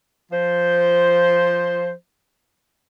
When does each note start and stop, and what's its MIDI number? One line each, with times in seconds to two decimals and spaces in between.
0.32 1.91 53
0.32 1.91 72